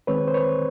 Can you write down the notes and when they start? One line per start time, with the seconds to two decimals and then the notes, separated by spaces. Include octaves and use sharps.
0.07 D#3 G#3 C4 B4 C#5
0.28 C5
0.34 B4 C#5